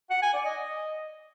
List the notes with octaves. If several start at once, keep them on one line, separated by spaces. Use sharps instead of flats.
F#5
G#5
D5
D#5